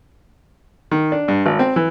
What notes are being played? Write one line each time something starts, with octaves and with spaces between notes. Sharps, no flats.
D#3
D4
G2
G#1
C4
E3